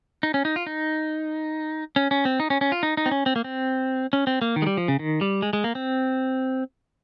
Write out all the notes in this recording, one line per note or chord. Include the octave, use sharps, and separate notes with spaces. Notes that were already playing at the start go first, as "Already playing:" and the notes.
D#4
C#4
D#4
F4
D#4
C#4
C#4
C4
D#4
C#4
C#4
F4
D#4
D#4
C4
C#4
C4
A#3
C4
C#4
C4
A#3
D#3
G#3
G3
F3
C#3
D#3
G3
G#3
G#3
A#3
C4